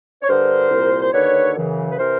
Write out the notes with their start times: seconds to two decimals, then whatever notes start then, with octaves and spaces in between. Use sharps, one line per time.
0.22 C#5
0.28 G2 D3 A#4 C5
0.71 C2 A#2
1.02 C5
1.13 D#2 D3 B4 C#5
1.56 F#2 C#3 E3
1.92 B4
1.99 C3 E3 A#4 C5